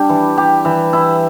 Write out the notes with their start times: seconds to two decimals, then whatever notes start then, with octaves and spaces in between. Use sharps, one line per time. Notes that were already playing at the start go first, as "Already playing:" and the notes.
Already playing: G3 D4 G4
0.09 E3
0.37 G4
0.65 E3
0.93 E4